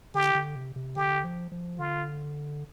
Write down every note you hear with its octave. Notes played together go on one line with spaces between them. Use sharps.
D3 G4
D3
C3
C3
D3 G4
F3
F3
D3 F4